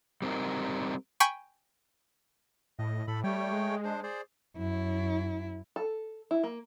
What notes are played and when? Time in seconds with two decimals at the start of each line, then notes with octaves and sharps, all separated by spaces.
0.22 G3 C4 D#4 A#4
1.20 G5 G#5 B5 C#6
2.79 A2 D#5
3.08 A2 A4 B5
3.24 G3 A3 C#5 G5
3.53 G#3
3.85 D4 C5
4.03 G#4 C5 D5
4.56 F#2 E4
5.76 A4
6.31 E4
6.43 A#3